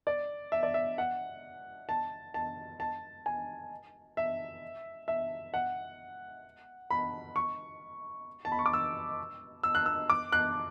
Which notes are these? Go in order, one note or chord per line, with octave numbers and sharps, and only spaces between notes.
D5
E5
D5
E5
F#5
A5
A5
A5
G#5
E5
E5
F#5
B5
C#6
A5
B5
C#6
D6
E6
E6
F#6
E6
D6
F#6